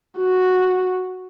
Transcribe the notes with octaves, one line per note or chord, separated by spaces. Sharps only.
F#4